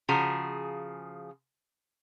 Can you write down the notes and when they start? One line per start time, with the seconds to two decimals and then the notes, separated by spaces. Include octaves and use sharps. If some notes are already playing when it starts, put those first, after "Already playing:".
0.09 C#3 F3 F#4 G#4 A#5